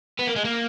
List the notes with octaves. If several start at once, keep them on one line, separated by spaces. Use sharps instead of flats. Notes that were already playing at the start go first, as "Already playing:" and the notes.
B3
A#3
G#3
A#3